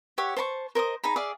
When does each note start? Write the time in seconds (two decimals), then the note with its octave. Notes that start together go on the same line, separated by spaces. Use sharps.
0.18 G4 C#5 E5 F#5
0.37 C5 A5 B5 C#6
0.75 A#4 C5 D#5 D#6
1.04 D#4 G#4 A#5 B5
1.16 G#4 D5 E5 F5